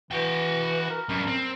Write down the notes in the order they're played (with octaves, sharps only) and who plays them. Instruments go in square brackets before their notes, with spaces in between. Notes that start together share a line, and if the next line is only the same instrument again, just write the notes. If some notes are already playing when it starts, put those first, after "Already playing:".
[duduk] E3 [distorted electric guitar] F#4 G5
[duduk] A#4
[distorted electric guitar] F#2 G3
C4